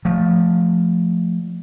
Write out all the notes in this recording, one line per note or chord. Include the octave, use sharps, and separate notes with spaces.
F3 A3